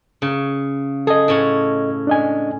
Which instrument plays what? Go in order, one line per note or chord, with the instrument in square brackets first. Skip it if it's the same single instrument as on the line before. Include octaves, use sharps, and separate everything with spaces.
[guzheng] C#3
[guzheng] G#4 [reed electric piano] A4 D#5
[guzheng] A2 C#4 F#5
[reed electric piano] D4 D#5 G#5